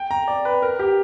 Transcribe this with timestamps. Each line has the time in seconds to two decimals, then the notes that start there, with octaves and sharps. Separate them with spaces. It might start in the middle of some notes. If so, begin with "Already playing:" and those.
Already playing: G5
0.11 A#5
0.28 D5
0.45 B4
0.62 A#4
0.79 G4